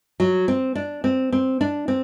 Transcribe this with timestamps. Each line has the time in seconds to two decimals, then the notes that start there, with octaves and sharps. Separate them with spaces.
0.20 F#3
0.48 C4
0.75 D4
1.04 C4
1.32 C4
1.61 D4
1.88 C4